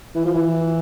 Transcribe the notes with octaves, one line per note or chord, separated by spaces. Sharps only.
E3
F3
E3